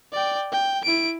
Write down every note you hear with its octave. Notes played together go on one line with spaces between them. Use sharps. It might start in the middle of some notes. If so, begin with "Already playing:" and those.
D5 G5
G5
E4 D7